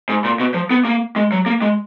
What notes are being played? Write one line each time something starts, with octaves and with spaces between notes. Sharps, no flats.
G#2
A#2
B2
F3
B3
A#3
G#3
F#3
A#3
G#3